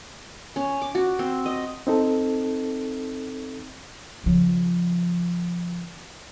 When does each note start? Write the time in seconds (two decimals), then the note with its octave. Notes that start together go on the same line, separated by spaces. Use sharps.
0.56 C#4
0.82 D6
0.95 F#4
1.19 C4
1.46 D#5
1.87 C4 D#4 A4
4.24 C#3 F3